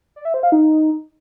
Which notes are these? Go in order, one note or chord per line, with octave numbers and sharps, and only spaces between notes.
D5
E5
C5
F5
D#4